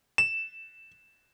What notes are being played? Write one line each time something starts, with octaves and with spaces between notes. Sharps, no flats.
E7